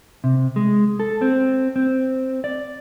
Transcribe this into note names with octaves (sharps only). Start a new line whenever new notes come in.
C3
G#3
A4
C4
C4
D5